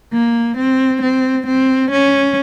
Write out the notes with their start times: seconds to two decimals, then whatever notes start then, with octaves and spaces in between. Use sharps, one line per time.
0.13 A#3
0.58 C4
1.02 C4
1.47 C4
1.91 C#4